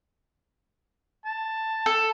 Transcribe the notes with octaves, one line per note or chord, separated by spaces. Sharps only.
A5
A4